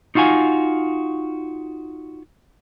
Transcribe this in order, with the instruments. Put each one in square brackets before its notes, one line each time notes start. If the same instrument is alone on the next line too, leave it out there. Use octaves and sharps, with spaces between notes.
[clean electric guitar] D#4 F4 F#4 F5 G#5